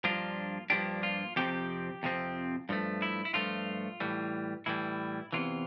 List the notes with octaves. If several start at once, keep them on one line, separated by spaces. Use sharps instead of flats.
G2 F3 A#3 D4 F4
G2 F3 A#3 D4 G4
F4
F2 C3 F3 C4 G4
F2 C3 F3 C4
G2 F3 A3
E4
E4
G2 F3 A3 F4
A2 E3 G3
A2 E3 G3 E4
E2 C3 E3 F4